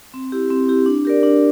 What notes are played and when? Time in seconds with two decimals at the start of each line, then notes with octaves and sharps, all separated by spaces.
0.14 C4
0.32 E4 G4
0.50 C4
0.68 E4 G4
0.86 D4
1.05 G4 A#4 D5
1.23 D4